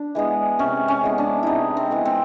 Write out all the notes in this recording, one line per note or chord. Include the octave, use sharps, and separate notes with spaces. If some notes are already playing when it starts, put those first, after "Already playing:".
Already playing: D4
E3 G#3 B3
C3 C#4
C#4
E3 G#3 B3
D4
C3 D#4 E4
C4
E3 G#3 B3
C4